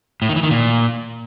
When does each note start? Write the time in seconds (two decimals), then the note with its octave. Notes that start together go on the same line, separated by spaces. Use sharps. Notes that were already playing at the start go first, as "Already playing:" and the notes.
0.22 A2
0.29 D#3
0.36 E3
0.43 D#3
0.51 A#2